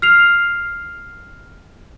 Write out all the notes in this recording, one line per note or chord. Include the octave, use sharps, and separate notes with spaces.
F6 C7 F7